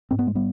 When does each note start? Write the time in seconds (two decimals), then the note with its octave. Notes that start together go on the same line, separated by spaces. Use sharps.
0.11 G#2 C4
0.19 B3
0.27 G#3
0.35 G3 B3